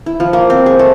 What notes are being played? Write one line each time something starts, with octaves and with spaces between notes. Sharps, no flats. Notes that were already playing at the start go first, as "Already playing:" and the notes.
E4
F3
A#3
C4
G#4
A3